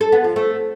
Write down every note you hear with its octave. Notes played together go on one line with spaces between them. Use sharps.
A4
B3
F3
A3